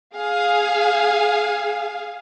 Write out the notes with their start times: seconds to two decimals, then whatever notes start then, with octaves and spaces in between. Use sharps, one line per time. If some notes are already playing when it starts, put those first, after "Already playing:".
0.15 G#4 F5 G#5